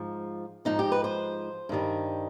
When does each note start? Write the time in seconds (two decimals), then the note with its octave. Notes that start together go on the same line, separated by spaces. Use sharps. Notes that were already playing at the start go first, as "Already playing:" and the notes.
Already playing: G#2 F3
0.65 G#2 F3 D#4
0.79 G4
0.92 B4
1.04 C5
1.69 G2 D#3 G3